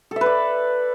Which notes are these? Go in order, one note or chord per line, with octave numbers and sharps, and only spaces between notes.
A4 B4 D5 E5